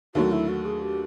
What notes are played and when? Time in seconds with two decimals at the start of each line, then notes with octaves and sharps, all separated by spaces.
0.15 D#2 D3 F#3 A3 F#4
0.32 E4
0.49 F#4
0.65 G#4
0.82 G4